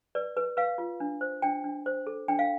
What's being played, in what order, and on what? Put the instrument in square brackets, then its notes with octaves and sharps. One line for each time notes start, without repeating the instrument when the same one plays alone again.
[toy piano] B4 D5
B4
B4 F5
F4
D4
C5
D4 G5
D4
C5
A4
D4 G5
F5